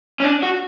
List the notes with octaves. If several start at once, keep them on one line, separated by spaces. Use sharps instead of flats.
C#4
D4
F#4